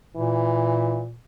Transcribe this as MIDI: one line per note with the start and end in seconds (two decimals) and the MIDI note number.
0.16 1.18 46
0.16 1.02 52